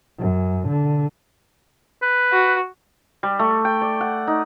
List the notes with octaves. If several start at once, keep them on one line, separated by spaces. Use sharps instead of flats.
F#2
D3
B4
F#4
G3
A3
G5
D5
F#5
D#4